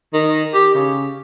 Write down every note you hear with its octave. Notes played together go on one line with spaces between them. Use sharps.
D#3
G4
C#3